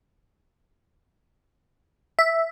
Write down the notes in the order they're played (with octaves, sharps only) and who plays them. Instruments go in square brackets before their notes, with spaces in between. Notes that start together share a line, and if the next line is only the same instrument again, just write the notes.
[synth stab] E5